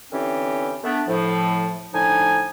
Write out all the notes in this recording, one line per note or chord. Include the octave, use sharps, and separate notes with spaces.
D3 E3 C4 C#4 G4 C#5
A3 B3 D4
A2 F3
A2 D3 F3 D#4 G#5